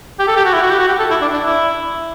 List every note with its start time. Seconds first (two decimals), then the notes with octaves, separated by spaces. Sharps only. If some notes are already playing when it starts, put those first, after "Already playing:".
0.20 G4
0.28 A4
0.36 G4
0.45 F#4
0.53 E4
0.62 F#4
0.70 G4
0.79 F#4
0.88 G4
0.99 A4
1.10 E4
1.22 D4
1.33 D4
1.45 E4